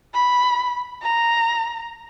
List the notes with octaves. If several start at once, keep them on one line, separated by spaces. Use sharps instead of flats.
B5
A#5